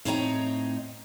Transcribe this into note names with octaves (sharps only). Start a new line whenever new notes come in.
A2 C4 D#4 C#5 A5 A#5